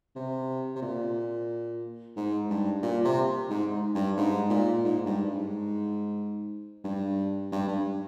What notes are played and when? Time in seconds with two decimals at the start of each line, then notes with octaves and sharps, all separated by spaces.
0.15 C3
0.75 C3
0.82 A#2
2.16 G#2
2.50 G2
2.83 A#2
3.05 C3
3.50 G#2
3.95 G2
4.17 G#2
4.50 A#2
4.84 G#2
5.06 G2
5.29 G#2
6.84 G2
7.52 G2
7.68 G2